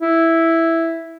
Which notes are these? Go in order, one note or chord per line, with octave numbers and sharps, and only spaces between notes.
E4